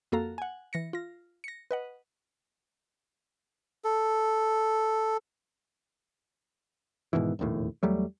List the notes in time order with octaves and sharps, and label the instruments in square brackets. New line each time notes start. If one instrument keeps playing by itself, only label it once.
[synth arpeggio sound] F2 A#3 F#4 A4 F5 A#5
F#5 G#5
E3 A#6 C#7
F4 A#6
A#6 C#7
B4 D#5 F#5
[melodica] A4
[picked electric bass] G#2 B2 D#3 E3
E1 A#1 D#2 A2
E2 F#3 G3 A3